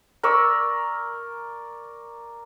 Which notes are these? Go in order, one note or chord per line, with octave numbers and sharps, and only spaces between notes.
A#4 D5 C#6 E6